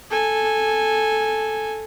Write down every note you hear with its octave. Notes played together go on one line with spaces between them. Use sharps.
A4 G#5